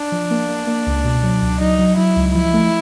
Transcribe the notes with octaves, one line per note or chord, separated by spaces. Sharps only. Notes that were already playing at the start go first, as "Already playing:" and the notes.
Already playing: D4
F3
A#3
A#3
A#3
C#2
B2
F#3
C#2
F#3 D#4
F#3
F#3 E4
C#2
F3 E4
A3